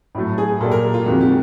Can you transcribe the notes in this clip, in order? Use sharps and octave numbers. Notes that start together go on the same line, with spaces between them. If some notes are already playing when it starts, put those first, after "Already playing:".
A2 F#3 A3
G#4
A#2 F#3 A#3 D4 G4 A4
A#4
F4
F2 C3 D#3 G#3 F#4
G4